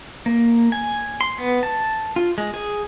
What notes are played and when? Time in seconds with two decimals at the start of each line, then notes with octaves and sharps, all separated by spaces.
0.26 A#3
0.72 G#5
1.21 C6
1.38 B3
1.63 A5
2.16 F4
2.38 G#3
2.54 G#4